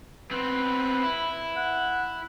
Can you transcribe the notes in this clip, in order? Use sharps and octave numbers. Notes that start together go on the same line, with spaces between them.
B3 C4 B4
E4
F#5